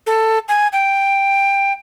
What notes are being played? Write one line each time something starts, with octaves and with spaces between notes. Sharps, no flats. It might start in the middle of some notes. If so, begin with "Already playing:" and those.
A4
G#5
G5